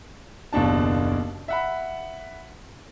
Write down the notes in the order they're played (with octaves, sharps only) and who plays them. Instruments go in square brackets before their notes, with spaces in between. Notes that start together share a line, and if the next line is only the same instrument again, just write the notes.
[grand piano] F#1 D#2 B2 D4 A5
E5 F#5 B5